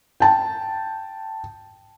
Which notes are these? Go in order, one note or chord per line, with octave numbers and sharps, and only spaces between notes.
G5 A5